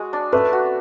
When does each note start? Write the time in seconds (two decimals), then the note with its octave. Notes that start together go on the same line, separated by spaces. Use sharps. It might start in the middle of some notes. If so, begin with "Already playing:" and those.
Already playing: G#3 F#4
0.13 D4
0.32 A3 B4
0.53 F#4